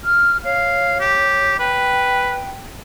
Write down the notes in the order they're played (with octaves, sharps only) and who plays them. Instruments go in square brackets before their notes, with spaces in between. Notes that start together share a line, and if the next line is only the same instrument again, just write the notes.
[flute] F6
[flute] C#5 [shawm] F5
[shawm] G4
[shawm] B4 [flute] G5